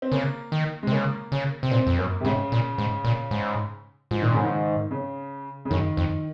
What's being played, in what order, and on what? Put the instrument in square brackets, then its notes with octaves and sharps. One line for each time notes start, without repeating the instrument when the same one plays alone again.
[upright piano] C4
[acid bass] C#3 [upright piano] A#3
[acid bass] D#3
[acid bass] C3 [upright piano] G#3
[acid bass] C#3 [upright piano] A#3
[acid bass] C#3
C3
[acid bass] A#2 [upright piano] C4
[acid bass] F2
[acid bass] F#2 [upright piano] A#3
[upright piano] C3
[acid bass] G#2 [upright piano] C#3
[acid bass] A#2
G#2
A#2
G#2
[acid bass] G#2 [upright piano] F3
[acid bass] A#2 [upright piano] D#3
[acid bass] G#2 [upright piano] C#3
[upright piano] D#3
C#3
C#3
[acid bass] F#2 [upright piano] D#3
[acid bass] F2